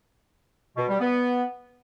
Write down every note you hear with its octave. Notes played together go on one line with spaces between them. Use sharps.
B2
G3
B3